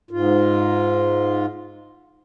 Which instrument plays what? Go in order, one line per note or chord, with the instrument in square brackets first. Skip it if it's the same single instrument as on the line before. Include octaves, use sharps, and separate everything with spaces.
[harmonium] G#2 F4